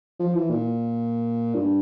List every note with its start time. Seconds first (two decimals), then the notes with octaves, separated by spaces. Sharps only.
0.19 F3
0.34 E3
0.50 A#2
1.54 G2